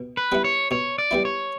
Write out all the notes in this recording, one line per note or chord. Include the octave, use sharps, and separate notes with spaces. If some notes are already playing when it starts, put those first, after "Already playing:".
Already playing: B2
B4
G3 B3 E4
C#5
B2 C#5
D5
G3 B3 E4
C#5